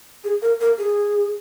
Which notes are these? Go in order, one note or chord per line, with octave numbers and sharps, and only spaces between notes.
G#4
A#4
A#4
G#4